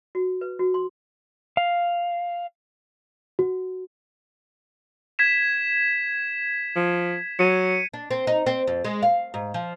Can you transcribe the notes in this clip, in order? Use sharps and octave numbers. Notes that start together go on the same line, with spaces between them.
F#4
B4
F#4
C6
F5
F#4
G#6 B6 E7
F3
F#3 C#7 D#7
D4
C4
D#4
C4
F2
G#3
F5
G#2
F3